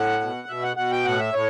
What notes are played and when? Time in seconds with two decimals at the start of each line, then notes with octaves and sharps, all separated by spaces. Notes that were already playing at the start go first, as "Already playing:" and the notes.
Already playing: A2 F#5
0.21 B2
0.48 B2 E5
0.63 F#5
0.77 B2 F#5
0.91 G5
1.05 A2 F#5
1.19 E5
1.33 A2 C#5